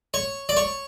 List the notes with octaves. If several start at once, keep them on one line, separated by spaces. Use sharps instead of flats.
C#5
D5
C#5